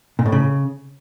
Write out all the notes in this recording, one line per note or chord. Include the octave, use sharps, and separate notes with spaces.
A#2
A2
C#3